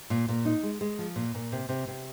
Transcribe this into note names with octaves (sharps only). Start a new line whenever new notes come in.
A#2
A#2
D#4
G#3
G#3
F3
A#2
A#2
C3
C3
C3